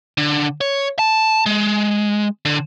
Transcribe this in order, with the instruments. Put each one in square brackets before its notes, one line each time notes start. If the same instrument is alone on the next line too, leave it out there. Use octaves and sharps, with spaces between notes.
[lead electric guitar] D3
C#5
A5
G#3
D3